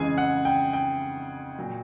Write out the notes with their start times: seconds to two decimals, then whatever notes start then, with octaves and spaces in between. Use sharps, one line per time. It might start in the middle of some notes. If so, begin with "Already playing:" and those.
Already playing: F2 C#3 E3 G#3 C#4 G#4 G#5
0.18 F#5
0.45 G5
0.73 G5
1.59 A#2 F#3